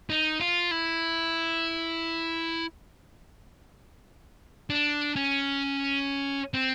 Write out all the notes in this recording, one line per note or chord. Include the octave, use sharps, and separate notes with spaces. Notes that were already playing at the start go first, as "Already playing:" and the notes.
D#4
F4
E4
D4
C#4
C4